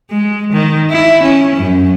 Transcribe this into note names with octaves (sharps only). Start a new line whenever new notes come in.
G#3
D#3
E4
C#4
F#2